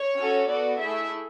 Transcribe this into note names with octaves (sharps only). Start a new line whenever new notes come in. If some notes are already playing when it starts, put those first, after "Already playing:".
Already playing: C#5
C#4 F#4 A4
B3 F#4 A4 D5
A3 E4 G#4 E5